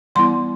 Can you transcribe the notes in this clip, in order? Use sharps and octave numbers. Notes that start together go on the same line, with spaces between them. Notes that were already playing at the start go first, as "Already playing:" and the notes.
E3 G3 B3 E4 C6